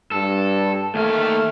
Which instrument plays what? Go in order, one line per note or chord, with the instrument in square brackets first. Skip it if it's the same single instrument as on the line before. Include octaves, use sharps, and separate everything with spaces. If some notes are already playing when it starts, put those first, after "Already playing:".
[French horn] G2 [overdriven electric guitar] A4
[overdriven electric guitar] D#2 F5 [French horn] A3